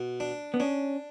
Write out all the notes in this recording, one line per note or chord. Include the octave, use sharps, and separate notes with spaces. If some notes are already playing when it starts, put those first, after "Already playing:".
Already playing: B2
D4
B3
C#4 D4